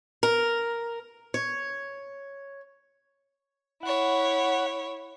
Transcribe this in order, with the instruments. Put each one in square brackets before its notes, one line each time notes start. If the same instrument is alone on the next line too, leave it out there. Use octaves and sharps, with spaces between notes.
[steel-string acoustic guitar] A#4
C#5
[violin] E4 C#5 [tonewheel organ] F#5